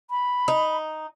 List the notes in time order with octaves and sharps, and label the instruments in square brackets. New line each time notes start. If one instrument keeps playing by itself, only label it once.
[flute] B5
[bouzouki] D#4